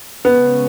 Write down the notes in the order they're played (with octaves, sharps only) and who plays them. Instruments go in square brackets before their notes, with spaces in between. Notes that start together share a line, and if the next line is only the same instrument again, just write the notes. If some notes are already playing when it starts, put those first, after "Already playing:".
[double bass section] C#3 G#3 C#4 [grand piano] B3